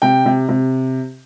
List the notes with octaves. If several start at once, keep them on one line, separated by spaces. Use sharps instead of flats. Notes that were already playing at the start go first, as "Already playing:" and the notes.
C3 G5
C3
C3